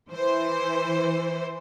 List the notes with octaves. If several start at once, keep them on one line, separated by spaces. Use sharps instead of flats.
E3 C5